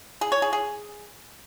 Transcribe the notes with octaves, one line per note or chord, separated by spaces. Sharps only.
G#4
C#5
G#4
G#4